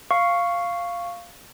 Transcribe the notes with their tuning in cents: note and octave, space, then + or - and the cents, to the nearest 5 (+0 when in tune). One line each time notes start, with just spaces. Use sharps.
F5 -5 C#6 +0